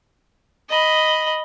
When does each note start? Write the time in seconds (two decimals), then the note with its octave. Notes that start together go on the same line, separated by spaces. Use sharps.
0.69 D#5 B5